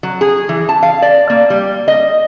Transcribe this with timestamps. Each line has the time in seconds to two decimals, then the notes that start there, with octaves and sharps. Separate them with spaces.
0.03 F#3
0.21 G#4
0.49 E3
0.69 A5
0.83 F5
1.02 D5
1.30 A#3
1.50 G3
1.88 D#5